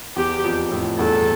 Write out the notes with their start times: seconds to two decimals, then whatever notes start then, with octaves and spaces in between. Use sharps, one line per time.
0.16 E2 G4
0.44 F2
0.71 F2 A2
0.99 E2 G2 A4